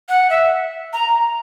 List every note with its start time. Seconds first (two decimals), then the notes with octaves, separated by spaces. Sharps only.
0.09 F#5
0.30 E5
0.93 A#5